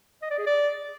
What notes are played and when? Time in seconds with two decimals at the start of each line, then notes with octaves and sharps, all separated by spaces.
0.22 D#5
0.30 D5
0.38 G#4
0.46 D5